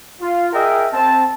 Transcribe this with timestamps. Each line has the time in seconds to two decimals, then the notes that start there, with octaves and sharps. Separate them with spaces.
0.21 F4
0.53 G#4 A#4 D#5 E5 G5
0.93 C4 A5